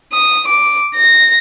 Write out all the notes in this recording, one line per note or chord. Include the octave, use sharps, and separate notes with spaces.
D#6
D6
A#6